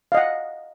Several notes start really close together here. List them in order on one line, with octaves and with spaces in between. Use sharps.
F5 D#5 F#5